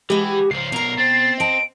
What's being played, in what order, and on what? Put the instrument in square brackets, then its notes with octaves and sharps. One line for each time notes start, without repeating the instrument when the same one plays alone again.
[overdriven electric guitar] E3 [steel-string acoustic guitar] G#3 F#4 [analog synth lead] G4
[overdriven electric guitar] C#2 F3 [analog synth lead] C7
[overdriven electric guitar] B1 A#4 [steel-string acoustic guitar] B2 A#5
[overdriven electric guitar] C4 [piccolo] A6
[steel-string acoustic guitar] D#5 A5 [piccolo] D7